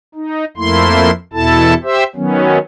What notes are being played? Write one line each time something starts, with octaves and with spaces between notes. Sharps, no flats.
D#4
F2 A3 A#3 E4 C6
E2 B2 E4 A4 A5
G4 C5 E5
D#3 F#3 B3 C#4